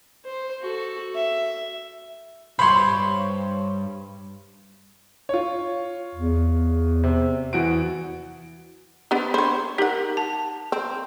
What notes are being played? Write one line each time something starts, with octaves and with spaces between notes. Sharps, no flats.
C5
F#4 A4
E5
B1 G2 C5 C#5 B5 C6
F4 C#5
E2
C3
E2 F#4 D7
B3 C4 D4 G4
C5 C#5 B5 C6
D#4 G4 A#4 F#5
A5
C4